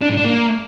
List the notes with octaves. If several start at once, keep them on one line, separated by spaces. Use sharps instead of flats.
D4
G#2
D4
A#3